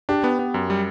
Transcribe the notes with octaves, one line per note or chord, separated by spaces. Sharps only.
D4 G4
B3
B3
F#2
G3